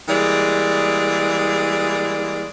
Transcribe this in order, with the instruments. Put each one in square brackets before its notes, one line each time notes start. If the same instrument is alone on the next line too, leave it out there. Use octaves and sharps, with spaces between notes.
[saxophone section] E3 G3 G#3 A#3 G#4 D5